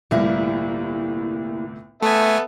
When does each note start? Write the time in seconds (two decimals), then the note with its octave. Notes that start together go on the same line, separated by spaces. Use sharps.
0.11 G1 C2 A2 G3 A#3 E4
2.02 A3 B3 A4 E5 G#5